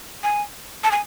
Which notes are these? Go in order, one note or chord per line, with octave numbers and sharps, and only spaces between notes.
G#5
A5
G#5